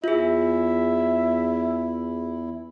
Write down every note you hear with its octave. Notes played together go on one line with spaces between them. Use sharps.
E2 E4 F4 G#4 E5